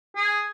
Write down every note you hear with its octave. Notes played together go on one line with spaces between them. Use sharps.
G#4